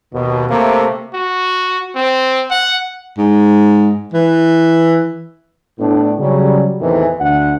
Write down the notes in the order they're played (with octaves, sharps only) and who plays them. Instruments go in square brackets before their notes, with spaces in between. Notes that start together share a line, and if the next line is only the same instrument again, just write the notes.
[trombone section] D#2 B2
C3 A3 A#3
[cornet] F#4
C4
F#5
[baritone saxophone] G#2
E3
[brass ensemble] A2 B3 D4
C#3 F#3 G3
E2 A2 C3 D#3 E3
D2 F#5